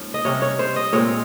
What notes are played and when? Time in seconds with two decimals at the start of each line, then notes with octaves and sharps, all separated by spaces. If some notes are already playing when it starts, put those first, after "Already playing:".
Already playing: G#2 F3 A#3 C#4
0.14 D#5
0.25 C3 G3 C#4 C#5
0.42 C#5
0.59 C5
0.76 D#5
0.93 A#2 G#3 C4 C#5